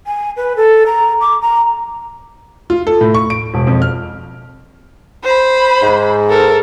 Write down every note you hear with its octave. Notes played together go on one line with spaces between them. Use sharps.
G#5
B4
A4
A#5
D6
A#5
F4
A4
A2
C#6
D7
E1
F2
F6
C5 B5
G#2
A4 A#4